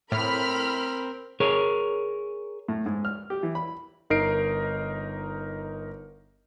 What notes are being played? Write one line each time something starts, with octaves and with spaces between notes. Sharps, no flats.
A2 C4 A#4 B5 F6
G#4 A#4 C#5
A2
G#2
F6
G4
E3
B5
G1 D#4 A#4 C7 D7